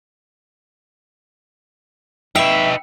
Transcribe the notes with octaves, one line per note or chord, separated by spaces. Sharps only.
D#4 B4 E5 G5